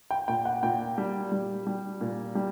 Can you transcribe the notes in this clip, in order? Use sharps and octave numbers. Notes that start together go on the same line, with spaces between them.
G5
A#2 G5
F#5
A#2 G5
G3
G3
G3
A#2
G3